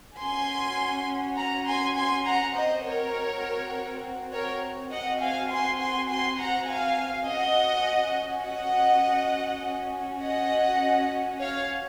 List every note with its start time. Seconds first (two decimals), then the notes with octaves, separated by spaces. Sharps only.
0.18 C#4 F#4 G#5 C6
1.36 F#5 A#5
1.66 G#5 C6
1.95 G#5 C6
2.25 F#5 A#5
2.54 C4 F#4 C5 D#5
2.84 A#4 C#5
4.32 A#4 C#5
4.91 C4 F#4 D#5 F#5
5.20 F5 G#5
5.49 G#5 C6
5.79 G#5 C6
6.08 G#5 C6
6.38 F#5 A#5
6.67 F5 G#5
7.27 C#4 F#4 D#5 F#5
8.44 D#5 F#5
9.63 C#4 F#4
10.22 D#5 F#5
11.40 C#5 F5